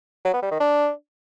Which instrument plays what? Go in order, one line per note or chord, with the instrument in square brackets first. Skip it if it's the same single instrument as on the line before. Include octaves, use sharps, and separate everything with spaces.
[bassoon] F#3
B3
G3
D#3
D4